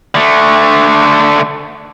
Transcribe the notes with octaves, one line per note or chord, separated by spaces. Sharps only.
D3 A3